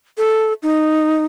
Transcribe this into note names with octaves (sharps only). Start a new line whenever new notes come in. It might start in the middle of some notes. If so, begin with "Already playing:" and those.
A4
D#4